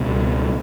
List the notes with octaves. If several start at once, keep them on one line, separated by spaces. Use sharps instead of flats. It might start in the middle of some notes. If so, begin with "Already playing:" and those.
Already playing: C#2 B2 G3